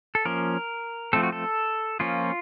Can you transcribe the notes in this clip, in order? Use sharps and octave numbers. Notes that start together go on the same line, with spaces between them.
A4
F3 A#3 C#4 A#4
F3 A3 C4 A4
F#4
A4
F3 A#3 C#4 F4